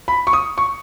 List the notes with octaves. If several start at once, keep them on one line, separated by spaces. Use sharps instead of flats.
B5
C#6
D#6
C#6